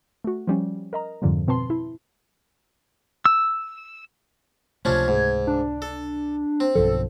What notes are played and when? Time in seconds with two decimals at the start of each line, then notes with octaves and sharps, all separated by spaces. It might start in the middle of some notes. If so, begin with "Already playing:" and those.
0.24 A3 F#4
0.47 F3 G3 C#4
0.93 A#4 D#5 A#5
1.22 F2 G#2 D3 F3 G3
1.47 B2 C4 B4 A5 C6
1.70 E4
3.25 E6
4.85 C#2 C3 F3 A3 C#4 D4 G#6
5.08 G#2
5.47 D4
5.82 A4
6.60 C4
6.75 B1 G2 F3 A4